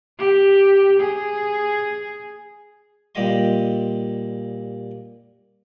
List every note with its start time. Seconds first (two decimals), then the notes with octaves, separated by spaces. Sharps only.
0.19 G4
1.00 G#4
3.15 A#2 G3 G4 D#5 C6